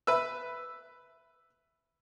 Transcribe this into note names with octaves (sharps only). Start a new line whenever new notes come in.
B4 E5